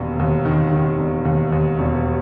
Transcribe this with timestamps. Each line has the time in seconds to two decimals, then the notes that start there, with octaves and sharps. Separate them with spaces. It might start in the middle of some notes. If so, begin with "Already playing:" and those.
Already playing: E1 D#2
0.19 D#2
0.45 D#3
0.72 D#3
0.99 E1
1.25 D#2
1.52 D#2
1.79 E1